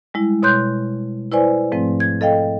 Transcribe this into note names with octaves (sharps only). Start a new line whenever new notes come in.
G3 G#3 E4
B2 C#5 C6 F#6 G6
E4 B4 C5 D5 G#5
G#2 F3 A3 C4
G#6
A4 D#5 F5 G5